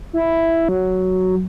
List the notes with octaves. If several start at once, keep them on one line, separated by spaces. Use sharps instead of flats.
E4
F#3